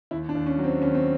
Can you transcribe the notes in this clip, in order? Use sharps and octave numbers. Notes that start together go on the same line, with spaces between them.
D#2 E4
D4
D#2
C#4
F#3
C4
D#2 C#4
C4